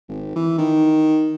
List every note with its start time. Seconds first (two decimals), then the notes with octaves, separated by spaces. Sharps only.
0.09 G#1
0.35 E3
0.58 D#3